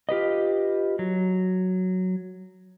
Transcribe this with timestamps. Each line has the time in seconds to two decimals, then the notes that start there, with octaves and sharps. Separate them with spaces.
0.09 F4 G4 B4 D#5
0.99 F#3